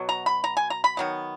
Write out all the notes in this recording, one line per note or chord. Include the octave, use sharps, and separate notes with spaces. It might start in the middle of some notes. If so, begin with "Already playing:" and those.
Already playing: B2 F#3
A#5
B5
A#5
G#5
A#5
B5
D#3 F#3 B3